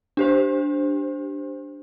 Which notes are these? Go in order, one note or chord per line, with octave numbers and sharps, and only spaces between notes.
D4 G4 C5